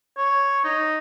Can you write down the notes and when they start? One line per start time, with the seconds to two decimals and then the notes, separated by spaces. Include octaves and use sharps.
0.17 C#5
0.64 D#4